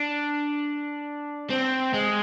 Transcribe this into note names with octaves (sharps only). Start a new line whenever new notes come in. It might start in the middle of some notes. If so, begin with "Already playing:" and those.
Already playing: D4
C4
G#3